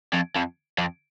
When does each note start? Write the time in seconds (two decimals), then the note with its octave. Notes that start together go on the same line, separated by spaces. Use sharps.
0.13 F2
0.36 F2
0.78 F2